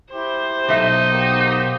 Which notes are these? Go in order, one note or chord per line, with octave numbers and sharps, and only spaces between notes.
E4 G4 C5
B1 D#4 E5
A#3 B3 G4